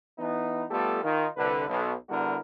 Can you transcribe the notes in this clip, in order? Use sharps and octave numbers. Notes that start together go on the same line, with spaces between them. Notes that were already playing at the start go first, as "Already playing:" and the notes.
E3 B3 D#4
G3 A3 B3 F4 G4 A4
D#3 D#4 F4
C2 D3 B4
B1
D3 G3 B3 E4 F#4 A#4